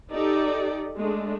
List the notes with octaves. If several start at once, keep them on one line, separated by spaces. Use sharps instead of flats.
D#4 G4 A4 D5
G#3 A3 D4